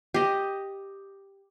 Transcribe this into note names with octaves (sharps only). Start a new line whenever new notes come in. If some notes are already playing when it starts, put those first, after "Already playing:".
G4 D#5